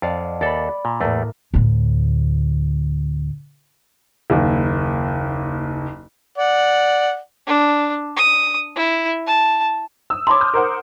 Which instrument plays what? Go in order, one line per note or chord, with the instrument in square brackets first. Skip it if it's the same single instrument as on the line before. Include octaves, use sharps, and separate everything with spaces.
[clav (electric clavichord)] F2 [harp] D5 F5 F#5
[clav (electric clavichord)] D#2 A4 [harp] D5 B5
[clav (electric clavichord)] A#2
[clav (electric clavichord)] E2 A3 [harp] A2 A#3
[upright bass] D2 A2
[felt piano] F#1 D#2
[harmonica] D5 F#5
[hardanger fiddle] D4
D#6
E4
A5
[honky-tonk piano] D#6 E6
[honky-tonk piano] C#5 A5 B5 [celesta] C6 D6
[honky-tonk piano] D#6 F6 G6
A#4 C5 F#5